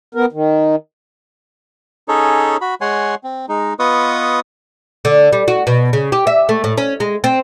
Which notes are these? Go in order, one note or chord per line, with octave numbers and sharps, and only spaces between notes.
B3 A#4
D#3
C#4 D#4 G#4 A4 C#5
F#4 B5
G#3 C#5 F#5 G#5 C6
C4
G#3 D#4
B3 F4 B4 D#5 C#6 D#6
D3
G3
F#4
B2
C#3
G4
E5
A3
A2
C#4
G#3
C4